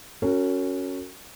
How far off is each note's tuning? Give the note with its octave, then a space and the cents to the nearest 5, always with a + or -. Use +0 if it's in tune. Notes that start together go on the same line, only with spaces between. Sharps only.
C#4 +0 F#4 +0 A#4 -35